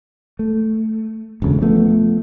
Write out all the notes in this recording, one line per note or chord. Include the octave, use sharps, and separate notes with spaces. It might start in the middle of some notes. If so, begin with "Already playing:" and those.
A3
E1 A1 D2 C#3
F3 A3 B3